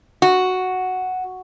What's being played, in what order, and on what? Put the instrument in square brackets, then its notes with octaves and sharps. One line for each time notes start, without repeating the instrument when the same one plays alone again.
[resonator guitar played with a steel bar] F#4